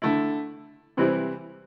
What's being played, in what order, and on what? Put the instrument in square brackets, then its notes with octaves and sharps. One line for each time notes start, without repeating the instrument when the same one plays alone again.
[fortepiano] D3 A3 E4
C3 E3 G3 C4 E4